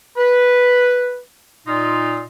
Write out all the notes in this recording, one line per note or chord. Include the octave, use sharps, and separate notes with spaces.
B4
A#2 D#4 F4